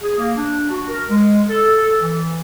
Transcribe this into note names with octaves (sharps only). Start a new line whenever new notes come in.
G#4
A#3
D4
F#4
A#4
G#3
A4
A4
E3